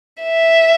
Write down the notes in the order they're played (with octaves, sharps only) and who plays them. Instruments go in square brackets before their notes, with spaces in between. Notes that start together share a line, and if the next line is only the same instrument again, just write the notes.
[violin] E5